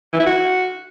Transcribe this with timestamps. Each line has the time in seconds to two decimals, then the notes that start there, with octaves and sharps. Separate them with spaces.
0.13 E3
0.20 E4
0.27 F#4